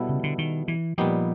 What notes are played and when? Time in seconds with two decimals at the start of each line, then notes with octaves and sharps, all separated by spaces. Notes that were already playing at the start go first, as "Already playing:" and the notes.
Already playing: B2 G3 B3 E4 A4
0.09 C#3
0.23 D3
0.38 D#3
0.68 E3
0.98 A#2 F3 G3 B3 D#4 G4